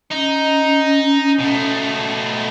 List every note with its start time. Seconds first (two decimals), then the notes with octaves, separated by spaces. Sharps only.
0.11 C#4 D#4
1.39 B2 A3